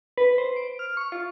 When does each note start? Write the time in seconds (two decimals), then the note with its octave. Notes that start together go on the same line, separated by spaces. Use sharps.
0.17 B4
0.38 C5
0.56 D7
0.79 F6
0.97 C#6
1.12 F4